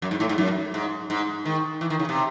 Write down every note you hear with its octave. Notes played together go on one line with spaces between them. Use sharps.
F#2
G#2
A2
G#2
F#2
G#2
G#2
D#3
E3
D#3
C#3
C3